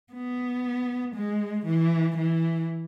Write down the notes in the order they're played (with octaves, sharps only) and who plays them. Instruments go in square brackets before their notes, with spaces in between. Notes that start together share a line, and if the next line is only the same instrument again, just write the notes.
[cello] B3
G#3
E3
E3